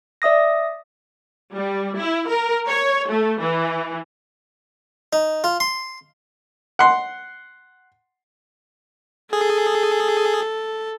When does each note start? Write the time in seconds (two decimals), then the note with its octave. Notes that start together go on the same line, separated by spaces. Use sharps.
0.22 D5 E5 D#6 A#6
1.54 G3
1.98 E4
2.28 A#4
2.68 C#5
3.10 A3
3.41 E3
5.13 D#4
5.44 F4
5.60 C6
6.79 F#5 C6
9.33 G#4 A4